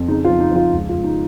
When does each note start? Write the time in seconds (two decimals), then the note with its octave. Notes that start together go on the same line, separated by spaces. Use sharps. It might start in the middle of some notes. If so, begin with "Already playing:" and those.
Already playing: F2
0.08 C#3 D#4
0.25 F4
0.30 F3
0.40 D#4
0.51 F3 F4
0.73 C#2
0.89 F4
0.94 C#2
1.04 D#4